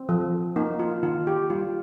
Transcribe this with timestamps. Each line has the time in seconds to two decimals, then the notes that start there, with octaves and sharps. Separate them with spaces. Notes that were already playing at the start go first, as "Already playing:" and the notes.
Already playing: C4
0.09 F3
0.56 A#3 D#4
0.79 F4
1.03 D#3 F4
1.27 G4
1.50 G3 F4